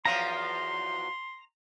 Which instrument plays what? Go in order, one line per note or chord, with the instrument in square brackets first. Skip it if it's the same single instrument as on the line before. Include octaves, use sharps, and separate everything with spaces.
[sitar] E2 F3 F#3 [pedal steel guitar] A#5 [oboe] C6